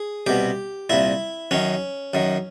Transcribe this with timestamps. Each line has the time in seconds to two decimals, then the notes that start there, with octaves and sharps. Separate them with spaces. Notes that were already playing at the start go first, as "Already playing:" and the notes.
Already playing: G#4
0.27 C2 B2 G4
0.90 C2 A#2 E4
1.51 F#2 D#3 C#4
2.14 F#2 D#3